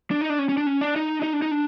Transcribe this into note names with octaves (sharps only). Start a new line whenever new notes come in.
D4
D#4
D4
C#4
C#4
D4
C#4
D4
D#4
D4
D#4
D4
D#4
D4